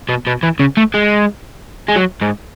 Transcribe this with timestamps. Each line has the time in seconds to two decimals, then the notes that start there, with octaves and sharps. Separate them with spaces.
0.09 B2
0.27 B2
0.43 E3
0.60 C#3
0.77 A3
0.94 G#3
1.88 G#3
1.96 F#3
2.22 G#2